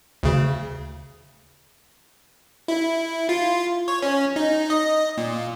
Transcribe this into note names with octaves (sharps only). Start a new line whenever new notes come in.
D2 C#3
E4
F4
C#5
C#4
D#4
D#5
A#2